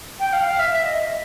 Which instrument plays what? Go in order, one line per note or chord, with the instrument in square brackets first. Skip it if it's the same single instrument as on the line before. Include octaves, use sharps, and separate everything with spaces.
[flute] G5
F5
F5
E5
E5
D#5